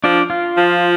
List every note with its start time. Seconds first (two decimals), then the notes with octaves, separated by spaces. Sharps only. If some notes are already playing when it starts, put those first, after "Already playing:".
0.04 F3 D4 D5
0.30 F4 F5
0.57 F3